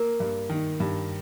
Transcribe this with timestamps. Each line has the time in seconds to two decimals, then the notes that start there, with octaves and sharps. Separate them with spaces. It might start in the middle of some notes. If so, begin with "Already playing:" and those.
Already playing: A#3 A#4
0.20 G2
0.49 D#3
0.80 G2